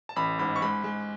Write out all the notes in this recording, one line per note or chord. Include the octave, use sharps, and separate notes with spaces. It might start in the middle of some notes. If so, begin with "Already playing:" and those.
A5
A1 B5
G#2 B5
C#6
G#3 B5
G#3